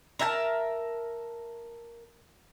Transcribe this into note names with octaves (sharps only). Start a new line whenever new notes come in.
A#4 E5 G5 A5